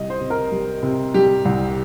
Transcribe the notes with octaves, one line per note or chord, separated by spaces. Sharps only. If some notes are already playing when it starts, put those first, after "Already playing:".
Already playing: C2 D#5
C5
C3
A#4
G3
C3
G3 G4
C2